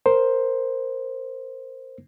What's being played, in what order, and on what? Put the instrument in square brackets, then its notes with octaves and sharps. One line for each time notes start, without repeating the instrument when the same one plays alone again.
[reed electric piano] A#4 C5